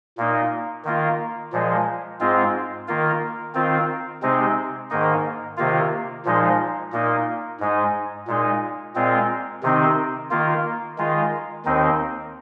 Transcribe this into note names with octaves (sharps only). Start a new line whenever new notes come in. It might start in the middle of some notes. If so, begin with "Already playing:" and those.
A#2 A#3 D#4
D#3 A#3 F4
A#2 F3 G#3
G#2 G#3 C4 F4
D#3 A#3 F4
D#3 C4 F4
C3 G#3 C4 D#4
G#2 D#3 A#3 D#4
C3 D#3 A#3 F4
A#2 F3 G#3 D#4
A#2 A#3 D#4
G#2 G#3 D#4
A#2 G#3 D#4
A#2 G#3 C4 F4
C3 D#3 C4 D#4
D#3 A#3 F4
D#3 G#3 F4
D#2 D#3 C4 D#4